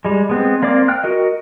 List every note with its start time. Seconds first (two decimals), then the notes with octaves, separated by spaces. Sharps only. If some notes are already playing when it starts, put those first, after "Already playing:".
0.05 G3 G#3
0.29 G#3 B3 C4
0.62 A#3 C4 D5 F5 D6
0.88 G5 F6 F#6
1.04 F#4 A#4 D#5